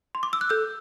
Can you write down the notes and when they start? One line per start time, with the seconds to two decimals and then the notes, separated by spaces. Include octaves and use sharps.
0.15 C6
0.23 D6
0.33 E6
0.41 F#6
0.49 A4 E6 G6